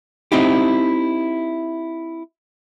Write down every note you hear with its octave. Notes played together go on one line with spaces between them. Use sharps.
C4 D#4 E4 G4